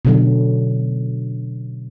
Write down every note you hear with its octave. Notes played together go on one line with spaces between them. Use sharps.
B2 D3 F#3